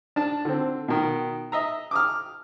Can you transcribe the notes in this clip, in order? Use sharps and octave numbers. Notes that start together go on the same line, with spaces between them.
D4 A5
D3 C4
B2 D#3
D#5 E5 A#5
D6 D#6 F6